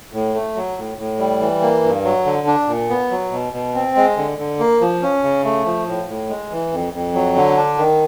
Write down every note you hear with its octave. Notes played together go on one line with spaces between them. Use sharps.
A2
A3
F#3
A2
A2
G3
E3
A#3
G2
F#3
D3
D4
A#2
B3
F#3
B2
B2
C4
G#3
D3
D3
A#3
F3
C#4
C#3
A3
F3
A2
A2
G#3
E3
F2
F2
F#3
D3
D4
D#3